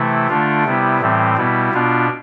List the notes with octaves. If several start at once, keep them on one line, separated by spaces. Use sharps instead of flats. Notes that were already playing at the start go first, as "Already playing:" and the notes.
Already playing: C3 E3 A3 E4
D3 A3 D4 F4
C3 G3 B3 E4
A2 E3 G3 C4
B2 G3 B3 E4
B2 B3 D4 F4